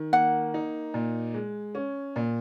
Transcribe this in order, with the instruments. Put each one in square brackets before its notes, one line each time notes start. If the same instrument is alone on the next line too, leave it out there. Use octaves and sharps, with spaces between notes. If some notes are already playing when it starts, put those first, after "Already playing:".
Already playing: [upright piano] D#3
[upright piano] A#3 [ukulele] F#5
[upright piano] D#4
A#2
G#3
C#4
A#2